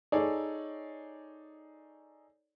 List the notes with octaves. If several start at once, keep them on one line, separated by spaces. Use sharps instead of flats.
D#4 G#4 A4 C#5 D5